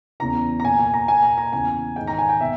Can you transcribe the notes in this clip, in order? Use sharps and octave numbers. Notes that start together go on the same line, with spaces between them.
E2 C#3 E3 A#5
A#5
A#2 G#5
G#5
A#5
A#2 G#5
A#5
A#5
E2 C#3 E3 G#5
G#2 D#3 G5
A#5
G#5
G5
B2 E5